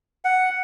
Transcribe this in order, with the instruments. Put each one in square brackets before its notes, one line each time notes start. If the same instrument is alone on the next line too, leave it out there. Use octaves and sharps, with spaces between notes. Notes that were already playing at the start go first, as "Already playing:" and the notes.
[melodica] F#5